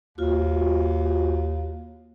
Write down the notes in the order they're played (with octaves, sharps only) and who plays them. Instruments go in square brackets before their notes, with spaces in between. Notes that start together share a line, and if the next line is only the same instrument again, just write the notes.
[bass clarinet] D#2 [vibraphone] F4 F#4